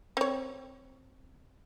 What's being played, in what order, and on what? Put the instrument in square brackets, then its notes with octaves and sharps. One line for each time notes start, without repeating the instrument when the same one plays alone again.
[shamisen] C4 C#5